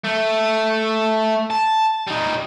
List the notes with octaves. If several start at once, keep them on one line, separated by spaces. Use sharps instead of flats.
A3
A5
G3 D#4